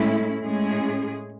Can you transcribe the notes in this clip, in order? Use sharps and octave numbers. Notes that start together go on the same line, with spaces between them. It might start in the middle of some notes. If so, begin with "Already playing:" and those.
Already playing: A2 G#3 A3 C#4 E4
A2 G#3 C#4 G#4